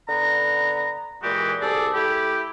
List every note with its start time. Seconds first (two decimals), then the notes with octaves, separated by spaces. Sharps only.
0.08 D3 B3 A#5
1.23 A#2 E3 G#3 F#4 G4
1.61 C2 G#4 A4 D5
1.94 A3 E4 G4